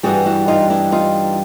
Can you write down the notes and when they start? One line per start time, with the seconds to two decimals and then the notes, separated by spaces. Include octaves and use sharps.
0.03 G2 E3 G3 F#4 G#4
0.26 E4 F#4
0.48 D#4 F4
0.70 D4 E4
0.92 D#4 F4